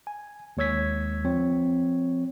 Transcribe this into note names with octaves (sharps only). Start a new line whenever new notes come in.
G#5
D#2 G#3 C#5 E6 G#6 B6
F3 C4 C#5